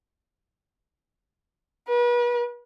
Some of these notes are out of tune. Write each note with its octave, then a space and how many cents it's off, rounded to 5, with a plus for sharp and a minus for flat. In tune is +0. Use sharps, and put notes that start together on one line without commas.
B4 -40